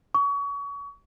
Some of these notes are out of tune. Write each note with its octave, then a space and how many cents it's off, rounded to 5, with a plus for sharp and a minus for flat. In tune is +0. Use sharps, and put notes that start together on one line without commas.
C#6 +30